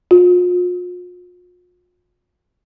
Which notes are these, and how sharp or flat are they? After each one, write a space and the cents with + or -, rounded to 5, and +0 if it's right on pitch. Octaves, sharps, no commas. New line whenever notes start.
F4 +40